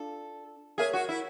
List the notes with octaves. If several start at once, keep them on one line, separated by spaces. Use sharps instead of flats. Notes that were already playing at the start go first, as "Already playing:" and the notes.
Already playing: D4 F4 A4
G#4 A#4 C#5 E5 G#5
F#4
E4